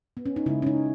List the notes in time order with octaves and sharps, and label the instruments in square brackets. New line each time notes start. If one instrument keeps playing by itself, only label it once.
[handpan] B3
C#4
D#4
C#3 G#3 E4
C#4
D#4